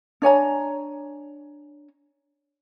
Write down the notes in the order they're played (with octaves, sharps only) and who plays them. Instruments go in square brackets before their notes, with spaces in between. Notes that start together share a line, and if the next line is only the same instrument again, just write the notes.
[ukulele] D4 C#5 G#5 A#5